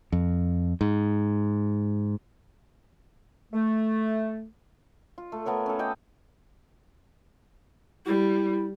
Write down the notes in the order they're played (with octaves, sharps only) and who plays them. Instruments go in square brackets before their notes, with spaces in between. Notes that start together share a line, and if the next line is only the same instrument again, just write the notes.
[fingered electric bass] F2
G#2
[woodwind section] A3
[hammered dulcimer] F4
A3
A3 B3 A#4 C#5
C#4 A4
D#5 G5 D6
[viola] G3 [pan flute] E4